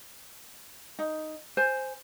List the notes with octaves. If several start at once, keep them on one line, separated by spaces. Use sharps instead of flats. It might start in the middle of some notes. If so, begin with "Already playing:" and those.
D#4
C5 G#5